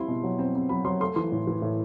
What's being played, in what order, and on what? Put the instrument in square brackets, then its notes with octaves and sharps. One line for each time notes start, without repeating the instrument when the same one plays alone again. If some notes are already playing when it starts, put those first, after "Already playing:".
Already playing: [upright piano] G3 C4 E4 C6
B2
F#3
C4
C4
F#3 B5
F#3 C6
A3 C6
E3 C6
A2
E3
A2